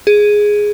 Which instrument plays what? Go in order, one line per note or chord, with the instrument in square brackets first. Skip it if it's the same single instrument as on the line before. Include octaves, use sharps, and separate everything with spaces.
[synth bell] G#4